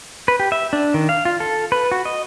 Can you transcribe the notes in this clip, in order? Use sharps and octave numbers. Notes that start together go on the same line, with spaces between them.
B4
G4
E5
D4
D#3
F5
F4
A4
B4
F#4
D#5